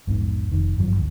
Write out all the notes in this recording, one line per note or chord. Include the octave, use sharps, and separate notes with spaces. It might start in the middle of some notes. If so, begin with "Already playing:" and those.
A#1 E2 G#2 B2
F1 D#3
G#1 G2 F3 F#3
A1 D2 A2